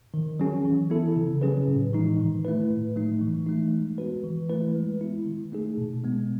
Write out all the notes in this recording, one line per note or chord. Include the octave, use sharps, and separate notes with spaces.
D#3
F#3 C#4 G#4
E3
B3 E4 A4
C#3
F#3 C#4 G#4 B4
A2
E3 G#3 D#4
D#3
A3 E4 B4
A2
F#3 A3 D#4
E3
A3 D#4
G#3
B3 F#4 B4
E3
A3 E4 B4
G#3
B3 E4
D#3
A3 D#4 G#4
B2
G#3 B3